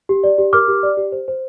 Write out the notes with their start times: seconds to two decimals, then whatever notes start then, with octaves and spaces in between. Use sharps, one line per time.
0.09 G4
0.24 D5
0.38 G4
0.53 A#4 D6 F6
0.68 G4
0.83 D5
0.97 G4
1.12 C5
1.28 C5